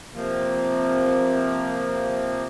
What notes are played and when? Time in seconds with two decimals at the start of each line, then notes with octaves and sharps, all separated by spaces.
0.14 C3 F3 A#3